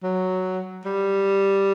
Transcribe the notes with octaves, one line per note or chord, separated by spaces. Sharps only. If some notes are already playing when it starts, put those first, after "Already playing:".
F#3
G3